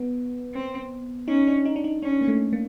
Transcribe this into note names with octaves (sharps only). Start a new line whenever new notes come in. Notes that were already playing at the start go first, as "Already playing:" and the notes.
Already playing: B3
C4
C#4 D#4
D4
D#4
D4
D#4
C#4 D4
A#3
A3
A#3